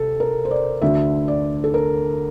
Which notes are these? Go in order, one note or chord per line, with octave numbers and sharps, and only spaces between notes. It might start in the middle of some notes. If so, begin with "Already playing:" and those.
Already playing: C3 A4
A#4
C5
D5
D2 D3 E5
D5
A4
A#4